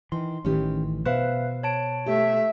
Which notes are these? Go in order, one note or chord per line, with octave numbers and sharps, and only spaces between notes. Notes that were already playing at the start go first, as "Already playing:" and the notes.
D#3 E3 C6
A1 D#3 E3 C#4 G4
B2 B4 C5 E5 F5
C#5 A5 D7
A3 G4 E5